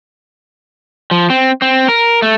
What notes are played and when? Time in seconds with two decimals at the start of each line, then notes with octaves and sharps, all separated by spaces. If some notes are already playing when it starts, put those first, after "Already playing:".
1.11 F3
1.30 C4
1.62 C4
1.88 A#4
2.22 A3